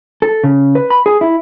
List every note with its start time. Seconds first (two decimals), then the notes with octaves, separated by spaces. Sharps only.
0.22 A4
0.44 C#3
0.75 B4
0.90 B5
1.06 G#4
1.21 E4